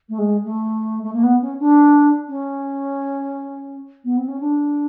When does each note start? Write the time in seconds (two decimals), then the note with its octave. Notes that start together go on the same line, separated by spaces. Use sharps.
0.09 A3
0.18 G#3
0.45 A3
1.03 A3
1.13 A#3
1.23 B3
1.42 C#4
1.60 D4
2.29 C#4
4.04 B3
4.17 C4
4.28 C#4
4.40 D4